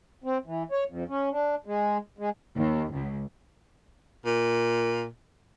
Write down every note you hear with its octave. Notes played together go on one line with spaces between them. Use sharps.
C4
E3
C#5
F2
C#4
D4
G#3
G#3
D#2
C#2
A#2